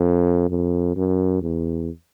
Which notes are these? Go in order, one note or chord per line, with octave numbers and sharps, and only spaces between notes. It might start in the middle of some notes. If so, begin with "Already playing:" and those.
Already playing: F2
F2
F#2
E2